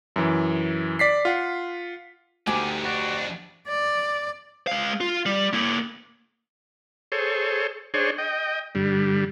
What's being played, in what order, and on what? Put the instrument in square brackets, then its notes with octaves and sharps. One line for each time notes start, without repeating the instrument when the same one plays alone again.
[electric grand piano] F#2 E3
D5 B6 C7
F4 F#5
[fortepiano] D2 [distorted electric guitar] D3 D#3 [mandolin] G4 [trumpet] G#5
[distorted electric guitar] F2 D4 [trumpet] F#4
[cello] D5
[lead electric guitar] G#3 F5
F4
G3
A#3 E4
[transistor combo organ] G#4 A4 C5 C#5
D4 G#4 C5 C#5
D#5 G5
G2 D3 G3